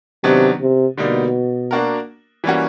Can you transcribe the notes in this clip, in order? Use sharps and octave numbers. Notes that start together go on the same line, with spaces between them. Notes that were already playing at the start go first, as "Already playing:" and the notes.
C3 D#3 F#3 B3 D4
C3
B2 D3 G3 A#3 D#4
A#3 D4 F#4 A#4
E3 G3 A#3 C#4 F#4